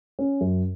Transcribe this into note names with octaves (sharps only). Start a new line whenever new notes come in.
C#4
F#2